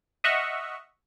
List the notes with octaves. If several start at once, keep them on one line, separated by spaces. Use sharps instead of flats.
D#5 E5 F#5 C#6 E6 F6